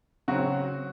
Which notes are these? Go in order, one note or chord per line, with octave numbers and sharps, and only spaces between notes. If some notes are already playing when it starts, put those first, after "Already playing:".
C#3 F#3 C4 F#4